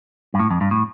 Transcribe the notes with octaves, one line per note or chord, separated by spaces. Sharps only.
G2
A2
F2
G2
A2